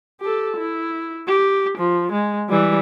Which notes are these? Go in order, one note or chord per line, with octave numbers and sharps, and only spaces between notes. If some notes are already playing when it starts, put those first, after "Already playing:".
G4 A4
E4
G4
F3
G#3
E3 G3